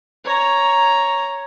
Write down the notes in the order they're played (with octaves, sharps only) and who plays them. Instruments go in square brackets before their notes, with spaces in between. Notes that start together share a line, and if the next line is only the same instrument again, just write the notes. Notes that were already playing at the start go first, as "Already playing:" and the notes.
[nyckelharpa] C#5 A#5